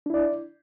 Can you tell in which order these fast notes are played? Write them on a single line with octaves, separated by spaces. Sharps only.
D4 E4 D5